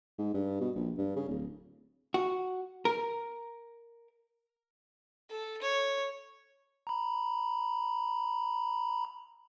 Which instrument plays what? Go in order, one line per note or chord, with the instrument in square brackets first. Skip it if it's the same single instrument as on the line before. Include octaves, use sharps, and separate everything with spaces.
[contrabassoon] G#2
G2
B2
A#1
G2
C#3
D1
[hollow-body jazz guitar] F#4
A#4
[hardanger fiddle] A4
C#5
[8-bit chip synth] A#5 B5